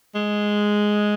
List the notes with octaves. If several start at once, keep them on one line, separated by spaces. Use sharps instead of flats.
G#3